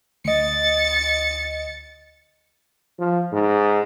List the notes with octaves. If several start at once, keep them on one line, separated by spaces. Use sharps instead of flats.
D2 D#5 A6 C#7
F3
G#2